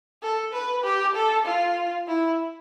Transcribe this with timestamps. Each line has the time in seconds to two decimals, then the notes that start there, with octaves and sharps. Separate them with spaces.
0.22 A4
0.53 B4
0.84 G4
1.15 A4
1.46 F4
2.08 E4